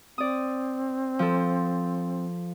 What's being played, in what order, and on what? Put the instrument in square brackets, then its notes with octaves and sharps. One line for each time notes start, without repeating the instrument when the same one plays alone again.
[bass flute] C4 [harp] D5 D#6
[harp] F3 A4